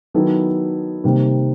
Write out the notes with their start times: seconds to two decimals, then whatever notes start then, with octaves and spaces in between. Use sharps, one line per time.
0.14 D#3 F#3 B3 E4 A4
1.04 C3 D#3 G3 A#3